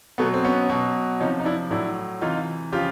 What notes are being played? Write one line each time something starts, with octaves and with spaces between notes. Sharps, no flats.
B2 F#3 A3 B3
C4
B3 C#4
B2 F#3
C3 F3 C#4 D#4
D#4
D4 E4
A2 F#3 D4 E4
C3 E3 D#4 F4
C#3 F3 F4 G4